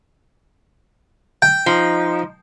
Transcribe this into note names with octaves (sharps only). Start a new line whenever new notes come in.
G5
F3 D#4